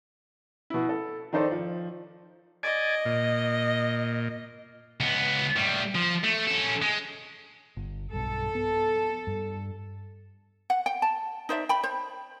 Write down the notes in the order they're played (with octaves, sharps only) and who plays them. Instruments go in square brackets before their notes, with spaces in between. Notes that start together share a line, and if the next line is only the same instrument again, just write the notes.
[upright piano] B2 E4
A4
D#3 D#4 A4 C5 D5
F3
[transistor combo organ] D5 G#5 [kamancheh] D#5
[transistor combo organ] A#2
[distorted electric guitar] C#2 B3
A2 G3
F3
A3
C#4 A4
G#3
[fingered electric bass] G1
[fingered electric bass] B1 G2 [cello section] A4
[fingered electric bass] B3
G2
[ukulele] F#5
G5
A5
D#4 C5 D5 E5
G5 B5
C5